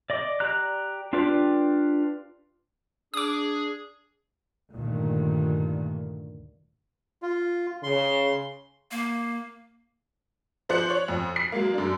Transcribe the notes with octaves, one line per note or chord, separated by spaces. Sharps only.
D5 D#5 D6
G4 D5 A#5 F#6
D4 F4 G4 B4 D5
D4 G#4 D6 D#6
D2 G2 A#2 D#3
F4
C#3 C6
A#3
F3 C5 D5 F#6 C#7 F#7
C#5
F2
C7
F#3 G#3 A#3
F#2 D4